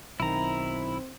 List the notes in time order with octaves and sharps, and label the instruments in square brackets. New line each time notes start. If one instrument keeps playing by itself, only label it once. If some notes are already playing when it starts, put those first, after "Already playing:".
[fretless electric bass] B1 D#3 [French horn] C4 [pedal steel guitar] E4 A#5